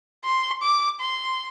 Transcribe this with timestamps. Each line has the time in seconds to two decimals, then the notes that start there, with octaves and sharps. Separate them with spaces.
0.25 C6
0.62 D6
1.00 C6